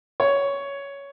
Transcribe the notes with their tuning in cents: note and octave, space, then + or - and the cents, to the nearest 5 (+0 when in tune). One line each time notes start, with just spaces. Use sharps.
C#5 +10